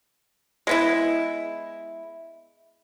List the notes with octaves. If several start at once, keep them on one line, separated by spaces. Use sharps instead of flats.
G#3 B3 E4